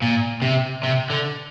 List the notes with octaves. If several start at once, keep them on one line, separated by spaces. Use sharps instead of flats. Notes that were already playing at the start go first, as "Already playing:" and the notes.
A#2
C3
C3
D3